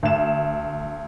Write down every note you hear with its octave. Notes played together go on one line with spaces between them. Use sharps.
D2 E7